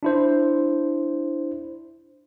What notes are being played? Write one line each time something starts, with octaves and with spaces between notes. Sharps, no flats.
D4 E4 C5